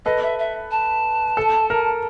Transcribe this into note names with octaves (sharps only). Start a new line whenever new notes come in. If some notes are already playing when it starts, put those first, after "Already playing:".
A4 B4 D#5
E5
E5
A5
A4
A#4